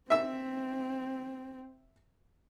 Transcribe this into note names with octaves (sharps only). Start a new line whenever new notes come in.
C4 E5 E6